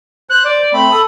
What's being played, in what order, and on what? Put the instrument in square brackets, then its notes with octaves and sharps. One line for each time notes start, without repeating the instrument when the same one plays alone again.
[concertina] C5 [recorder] F#6
[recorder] D5
[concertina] A3 C4 [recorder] B5
[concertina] A4 D#6